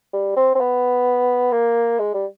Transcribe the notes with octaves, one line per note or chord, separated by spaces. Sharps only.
G3
C4
C4
B3
A#3
G#3
G3